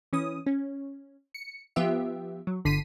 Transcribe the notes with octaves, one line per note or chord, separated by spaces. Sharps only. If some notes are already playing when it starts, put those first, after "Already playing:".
E3 C#4 D#6
C#4
C#7
F3 B3 F4 G4 E5
F#3
G1 D3 B6 C7 D#7